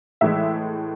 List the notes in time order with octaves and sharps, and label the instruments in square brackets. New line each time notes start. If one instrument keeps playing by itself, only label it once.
[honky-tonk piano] A2 E3 G#3 E5